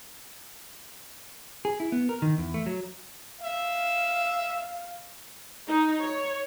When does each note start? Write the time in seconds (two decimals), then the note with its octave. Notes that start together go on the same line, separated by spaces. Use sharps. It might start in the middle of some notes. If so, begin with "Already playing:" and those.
1.65 G#4
1.80 E4
1.92 B3
2.09 A#4
2.22 D#3
2.38 E2
2.54 A3
2.66 F#3
3.44 E5 F5
5.68 D#4
6.02 C#5